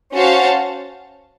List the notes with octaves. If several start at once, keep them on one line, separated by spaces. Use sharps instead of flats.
C#4 F#4 C5 F5 A5